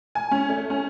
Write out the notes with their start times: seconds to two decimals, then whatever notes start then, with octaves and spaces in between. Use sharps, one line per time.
0.15 G#5
0.31 C#4
0.49 A3
0.70 C#4